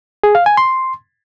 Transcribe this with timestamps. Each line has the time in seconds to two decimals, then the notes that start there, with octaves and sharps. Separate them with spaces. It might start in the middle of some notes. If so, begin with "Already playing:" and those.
0.24 G#4
0.35 F5
0.46 G#5
0.57 C6